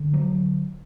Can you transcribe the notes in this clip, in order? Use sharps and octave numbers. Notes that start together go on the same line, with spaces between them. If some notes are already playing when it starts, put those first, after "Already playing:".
Already playing: D3
F#3